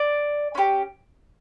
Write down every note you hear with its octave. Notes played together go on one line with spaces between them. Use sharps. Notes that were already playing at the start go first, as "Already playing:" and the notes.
Already playing: D5
C#4 E4 G4